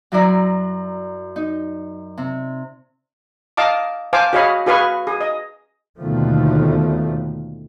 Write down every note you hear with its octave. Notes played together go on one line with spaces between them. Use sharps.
F#2 F#3 E4 F#4 D5 A#5
D#4
C3
D#5 F5 A5 D6
C5 F5 G#5 A5 D6
F#4 G#4 C#5 D#5 F5 B5
F#4 G#4 B4 F5 B5 C#6
G#4
D#5
D#2 B2 D3 D#3 F3 A3